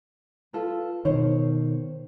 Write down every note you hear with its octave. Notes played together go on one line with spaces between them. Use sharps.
F4 A4 B4
B2 D#3 C5 C#5